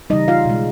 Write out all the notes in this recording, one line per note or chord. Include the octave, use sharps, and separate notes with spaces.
C#3 E3 G3 D#4 D#5
F4 F5
B2 G#3